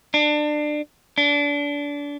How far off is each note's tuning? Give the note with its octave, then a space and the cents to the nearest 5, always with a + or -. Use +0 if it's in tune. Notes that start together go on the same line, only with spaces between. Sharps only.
D4 +25
D4 -25